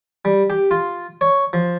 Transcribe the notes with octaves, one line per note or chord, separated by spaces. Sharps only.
G3
G4
F4
C#5
F3